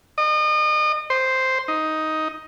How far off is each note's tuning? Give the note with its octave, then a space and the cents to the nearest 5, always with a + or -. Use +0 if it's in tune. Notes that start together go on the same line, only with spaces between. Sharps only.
D#5 -35
C5 -5
D#4 +10